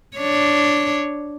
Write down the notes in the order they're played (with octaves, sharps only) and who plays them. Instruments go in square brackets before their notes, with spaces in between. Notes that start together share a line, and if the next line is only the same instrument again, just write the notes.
[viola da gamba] D4 C#5